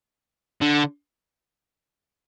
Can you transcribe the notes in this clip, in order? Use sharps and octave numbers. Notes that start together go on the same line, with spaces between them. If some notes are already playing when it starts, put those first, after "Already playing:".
D3